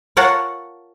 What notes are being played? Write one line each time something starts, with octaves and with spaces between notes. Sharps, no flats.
F4 A#4 C#5 F#5 A5